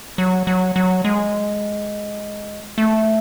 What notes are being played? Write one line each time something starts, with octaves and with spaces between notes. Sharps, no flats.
F#3
F#3
F#3
G#3
A3